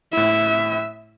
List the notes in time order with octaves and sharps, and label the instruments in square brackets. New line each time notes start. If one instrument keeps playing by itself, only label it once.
[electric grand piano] A2 E4 [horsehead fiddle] E5